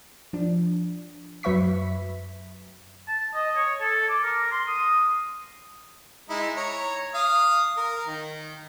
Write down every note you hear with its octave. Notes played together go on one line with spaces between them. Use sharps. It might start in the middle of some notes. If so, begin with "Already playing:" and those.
F3 D4
F#2 F#3 B4 E5 C#6 B6
A5
D#5
C#5
A4
D6
A#4
C6
D#6
G#3 D#4 E4
C#5 A#5
F5 D#6
A#4
D#3